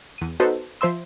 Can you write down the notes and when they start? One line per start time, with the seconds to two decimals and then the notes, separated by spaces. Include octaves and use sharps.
0.18 E2 D#7
0.40 B3 D#4 F#4 A4 B4 C5
0.81 F3 C5 E5 C6 E6